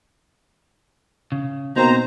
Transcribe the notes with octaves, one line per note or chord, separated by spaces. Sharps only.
C#3
B2 A#3 C4 D#4 C5 A#5